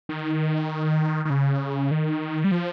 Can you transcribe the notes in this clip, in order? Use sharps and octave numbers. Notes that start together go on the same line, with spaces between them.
D#3
D#3
C#3
D#3
G3
F3